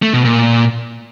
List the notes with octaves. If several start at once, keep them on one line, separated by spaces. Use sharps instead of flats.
A3
B2
A#2